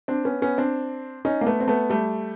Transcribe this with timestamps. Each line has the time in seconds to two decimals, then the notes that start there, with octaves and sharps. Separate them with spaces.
0.08 C4 D4
0.25 B3 C#4
0.42 B3 C#4
0.58 C4 D4
1.25 C#4 D#4
1.41 A#3
1.46 A3 B3
1.60 C4
1.68 A3 B3
1.90 G3 A3